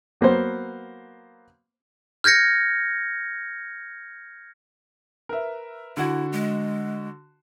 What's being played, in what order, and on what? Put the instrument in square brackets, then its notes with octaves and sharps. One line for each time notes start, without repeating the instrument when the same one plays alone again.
[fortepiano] F#3 A#3 B3 C5
[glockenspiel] F6 G6 G#6 A#6 C#7
[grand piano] A#4 B4 E5
[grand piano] D3 F#4 [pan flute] E4
[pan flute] G#3